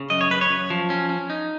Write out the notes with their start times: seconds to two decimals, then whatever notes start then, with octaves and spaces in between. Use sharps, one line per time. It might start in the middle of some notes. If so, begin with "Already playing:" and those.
Already playing: C#3
0.10 F#2 D#5
0.21 C#5
0.30 F#2 B4
0.41 C#5
0.50 F#2
0.70 F3
0.90 C#4
1.10 C#4
1.30 D#4